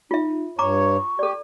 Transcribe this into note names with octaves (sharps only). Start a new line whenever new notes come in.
D#4 F4 E5
G2 C#5 A#5 C#6 D6
G4 A4 D5